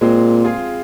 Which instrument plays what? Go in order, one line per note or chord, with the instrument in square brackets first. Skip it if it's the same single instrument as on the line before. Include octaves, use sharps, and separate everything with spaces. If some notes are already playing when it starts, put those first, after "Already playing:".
[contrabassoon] A#2 [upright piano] G#3 C4
[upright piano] F4 G#4